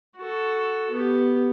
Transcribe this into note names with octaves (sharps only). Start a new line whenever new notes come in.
F#4 A4
B3 G4